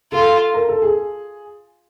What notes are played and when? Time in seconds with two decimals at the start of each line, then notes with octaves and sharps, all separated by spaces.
0.12 F4 A4
0.54 A#4
0.69 A4
0.82 G#4